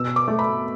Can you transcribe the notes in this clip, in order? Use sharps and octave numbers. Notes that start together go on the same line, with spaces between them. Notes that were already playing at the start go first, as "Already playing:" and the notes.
Already playing: B2 E6
D6
A3
B5